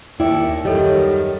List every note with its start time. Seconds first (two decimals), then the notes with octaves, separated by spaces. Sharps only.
0.20 D#2 E4 D5 G5 C#7
0.65 F#2 D#3 G3 A4 C#5 D#5